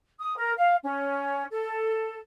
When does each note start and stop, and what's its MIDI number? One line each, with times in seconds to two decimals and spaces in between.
0.20 0.36 87
0.36 0.52 70
0.57 0.75 77
0.83 1.44 61
1.51 2.18 69